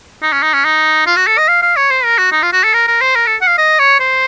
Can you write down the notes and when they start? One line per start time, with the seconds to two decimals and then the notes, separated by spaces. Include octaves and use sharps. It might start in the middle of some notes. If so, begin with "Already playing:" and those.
0.22 D#4
0.32 C#4
0.43 D#4
0.54 C#4
0.65 D#4
1.06 F4
1.16 F#4
1.27 A4
1.38 D#5
1.48 F5
1.62 F5
1.76 C#5
1.91 C5
2.05 A#4
2.18 F#4
2.31 D#4
2.42 F4
2.53 F#4
2.64 A4
2.74 A#4
2.88 A#4
3.01 C5
3.15 A#4
3.27 A4
3.41 F#5
3.47 F5
3.58 D#5
3.79 C#5
4.00 C5